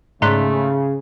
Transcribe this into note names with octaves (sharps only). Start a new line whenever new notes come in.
G#2 C#3 A3 D5 A#5 C6 F#6 B6